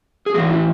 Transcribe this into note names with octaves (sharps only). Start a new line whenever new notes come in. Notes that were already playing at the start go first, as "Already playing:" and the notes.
G#4
A2 E3 F#4
E4